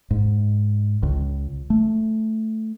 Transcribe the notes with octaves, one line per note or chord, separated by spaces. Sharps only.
G#2
C#2
A3